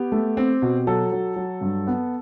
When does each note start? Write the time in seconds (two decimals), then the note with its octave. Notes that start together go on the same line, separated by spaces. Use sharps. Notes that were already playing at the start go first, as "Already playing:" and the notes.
Already playing: B3 G4
0.12 A3
0.37 C4
0.62 B2
0.87 F#3 A4
1.12 F#3
1.36 F#3
1.61 G2
1.87 B3